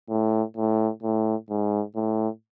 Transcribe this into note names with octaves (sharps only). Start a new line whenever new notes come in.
A2
A2
A2
G#2
A2